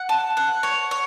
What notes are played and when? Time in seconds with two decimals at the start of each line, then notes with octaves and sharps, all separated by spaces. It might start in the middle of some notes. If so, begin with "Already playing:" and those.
Already playing: F#5
0.09 A5
0.37 F#5
0.63 C#5
0.91 C#5